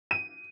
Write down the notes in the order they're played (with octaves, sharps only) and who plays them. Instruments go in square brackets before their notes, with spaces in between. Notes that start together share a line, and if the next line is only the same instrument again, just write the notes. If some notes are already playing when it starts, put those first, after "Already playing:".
[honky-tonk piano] D#7